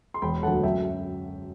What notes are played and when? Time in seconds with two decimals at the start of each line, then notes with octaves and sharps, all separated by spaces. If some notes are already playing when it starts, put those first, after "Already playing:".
0.14 C6
0.22 E1 G5 B5
0.43 D2 D3 F#3 A3 F#5 A5
0.63 F#2 E5 G5